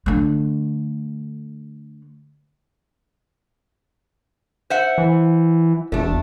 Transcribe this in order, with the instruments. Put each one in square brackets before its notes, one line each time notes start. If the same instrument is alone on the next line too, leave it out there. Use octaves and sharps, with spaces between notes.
[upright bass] D3 A3
[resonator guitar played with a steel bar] C5 E5 F#5
[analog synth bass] E3
[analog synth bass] E1 [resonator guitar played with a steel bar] A3 D4